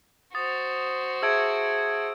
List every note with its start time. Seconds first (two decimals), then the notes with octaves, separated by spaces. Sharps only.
0.35 F#4 C5 D#6 A6
1.22 G#4 E5 A5 E6 G#6 D7